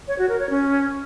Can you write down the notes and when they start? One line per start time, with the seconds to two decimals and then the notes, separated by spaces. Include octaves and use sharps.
0.08 C#5
0.18 F#4
0.29 A#4
0.39 C#5
0.50 C#4